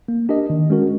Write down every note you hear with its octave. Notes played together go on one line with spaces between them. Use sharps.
A#3
D4 G4 A#4 D#5
D#3
G#3 C#4 F#4 A#4